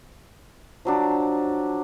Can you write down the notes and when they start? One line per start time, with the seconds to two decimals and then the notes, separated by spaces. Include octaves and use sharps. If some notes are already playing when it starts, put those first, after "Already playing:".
0.85 F3 F#3 D4